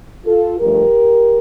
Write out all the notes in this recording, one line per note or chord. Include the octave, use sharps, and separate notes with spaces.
F4 A4
G2 F3 A3 G4 A#4